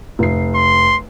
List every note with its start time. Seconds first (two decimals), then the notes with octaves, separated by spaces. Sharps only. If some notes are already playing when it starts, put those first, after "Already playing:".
0.19 F1 C7
0.55 C6